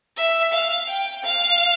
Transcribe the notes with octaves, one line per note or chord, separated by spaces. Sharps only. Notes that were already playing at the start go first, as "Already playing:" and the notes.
E5
F5
G5
F5